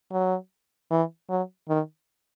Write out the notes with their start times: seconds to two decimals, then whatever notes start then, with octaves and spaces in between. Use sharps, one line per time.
0.12 F#3
0.91 E3
1.29 F#3
1.68 D#3